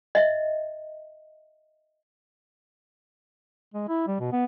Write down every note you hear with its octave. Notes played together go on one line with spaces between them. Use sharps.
D#5 E5
G#3
E4
G3
B2
B3